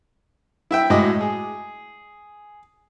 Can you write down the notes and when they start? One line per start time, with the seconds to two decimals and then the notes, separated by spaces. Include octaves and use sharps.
0.71 E4 E5 G5
0.90 A2 G#3 F#4 D#5 D6
1.21 G#4